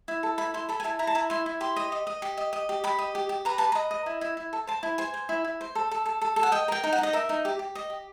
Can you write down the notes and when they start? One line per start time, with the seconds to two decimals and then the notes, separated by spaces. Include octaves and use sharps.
0.08 E4
0.23 A4
0.38 E4 B5
0.54 E4 C6
0.69 A4 B5
0.80 G#5
0.84 E4 A5
0.99 E4 A#5
1.07 A5
1.15 E4 A#5
1.30 E4 C6
1.46 E4
1.61 G4 C6
1.76 D#5
1.92 D#5
2.07 D#5
2.22 G4
2.37 D#5
2.53 D#5
2.69 G4
2.84 G4 B5
2.99 D#5
3.15 G4
3.29 G4
3.45 B4 A#5
3.58 B4 A5
3.72 D#5 A#5
3.91 D#5
4.06 E4
4.21 E4
4.37 E4
4.53 A4
4.67 C5 A5
4.83 E4
4.98 C5 G#5
5.14 C5
5.29 E4
5.44 E4
5.61 C5
5.75 A4
5.91 A4
6.06 A4
6.21 A4
6.36 A4
6.43 F#5
6.52 D#5 G5
6.68 A#4 G5
6.84 D#4
6.93 F#5
6.98 D#4 D#5
7.13 A#4 E5
7.29 D#4
7.45 G4
7.59 G4
7.75 D#5
7.90 G4